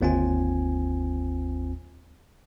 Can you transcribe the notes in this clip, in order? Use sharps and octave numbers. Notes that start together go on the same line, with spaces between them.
G1 D#2 C4 F4 G#5